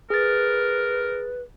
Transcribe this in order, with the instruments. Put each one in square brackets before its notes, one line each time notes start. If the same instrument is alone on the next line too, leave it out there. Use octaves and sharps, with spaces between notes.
[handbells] G#4 A6 [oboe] A#4 [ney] B4